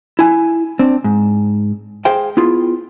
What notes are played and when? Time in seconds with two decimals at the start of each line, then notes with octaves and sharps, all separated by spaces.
0.19 E4 G#5
0.79 C4 D4
1.04 G#2
2.05 G#4 C5 F5 G5
2.37 B3 E4 F4 G#4